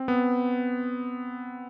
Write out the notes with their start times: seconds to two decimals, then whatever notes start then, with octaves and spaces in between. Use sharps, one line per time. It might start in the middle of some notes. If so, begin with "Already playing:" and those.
Already playing: C4
0.08 B3